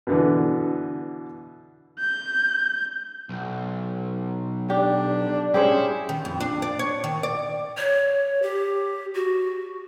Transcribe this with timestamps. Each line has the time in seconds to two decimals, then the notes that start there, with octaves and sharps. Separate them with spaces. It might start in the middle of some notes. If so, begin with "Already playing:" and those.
0.07 B2 D3 E3
1.99 G6
3.29 B1
4.70 D4 G4
5.54 C#4 E4 G4 G#4 C5
6.09 D#3
6.25 F2
6.40 D4
6.62 D5
6.79 C#5
7.04 D#3
7.23 D5
7.77 C#5
8.42 G4
9.14 F#4